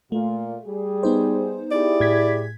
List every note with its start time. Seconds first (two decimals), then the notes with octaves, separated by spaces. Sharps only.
0.12 A#2 A3 F4
0.65 G3 G#4
1.03 B3 D#4 C5
1.71 E4 G4 G#4 D5
2.00 A2 G#6 B6